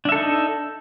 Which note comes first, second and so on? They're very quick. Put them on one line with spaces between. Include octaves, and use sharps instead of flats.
D4 E5 A4 D#4